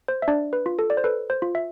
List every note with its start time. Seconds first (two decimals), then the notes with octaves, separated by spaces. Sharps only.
0.08 C5
0.22 E5
0.28 D4 D5
0.53 B4
0.66 F4
0.79 A4
0.90 D5
0.97 C5
1.04 A4 B4
1.30 C5
1.42 F4
1.55 E5